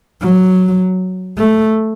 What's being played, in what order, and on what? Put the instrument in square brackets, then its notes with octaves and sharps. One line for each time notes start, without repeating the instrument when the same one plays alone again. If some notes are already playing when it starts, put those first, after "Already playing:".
[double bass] F#3
A3